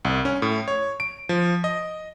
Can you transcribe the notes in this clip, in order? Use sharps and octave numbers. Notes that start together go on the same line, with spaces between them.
C2
C#4
A2
C#5
D7
F3
D#5